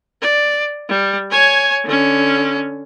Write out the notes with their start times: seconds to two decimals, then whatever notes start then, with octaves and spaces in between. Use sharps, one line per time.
0.22 D5
0.89 G3
1.31 C#5 G#5
1.85 D3 C#4